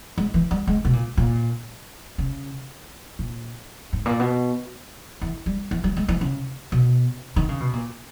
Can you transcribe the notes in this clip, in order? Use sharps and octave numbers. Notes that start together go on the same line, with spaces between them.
G#3
E3
G3
G#3
B2
A#2
A#2
C#3
A#2
G#2
A#2
B2
E3
G3
E3
G3
G#3
E3
C#3
B2
D#3
C#3
B2
A#2